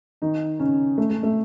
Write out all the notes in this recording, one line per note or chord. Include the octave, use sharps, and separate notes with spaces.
D#3 D#4
C#3 C#4
A3
A3
A3